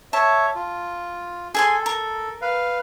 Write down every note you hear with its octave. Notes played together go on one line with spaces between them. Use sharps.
C#5 E5 A5
F4
G#4 A4 G#5 C6
A#4
B4 F5